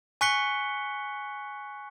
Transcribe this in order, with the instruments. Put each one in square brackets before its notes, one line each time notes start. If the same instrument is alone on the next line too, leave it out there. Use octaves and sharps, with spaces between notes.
[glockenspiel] G#5 C#6 F#6 B6 C#7 G7